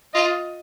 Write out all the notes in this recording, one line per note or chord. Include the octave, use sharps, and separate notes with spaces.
F4 D#5